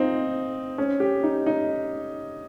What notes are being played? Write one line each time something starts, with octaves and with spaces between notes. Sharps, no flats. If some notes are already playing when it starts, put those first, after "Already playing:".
Already playing: C4 D#4 F4
C#4
G4
D#4
D#4